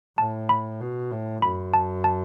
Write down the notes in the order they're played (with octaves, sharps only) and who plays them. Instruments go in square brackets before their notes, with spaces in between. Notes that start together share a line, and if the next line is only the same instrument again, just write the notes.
[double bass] A2 [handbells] A5
[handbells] B5
[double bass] B2
A2
[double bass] F#2 [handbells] B5
[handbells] A5
A5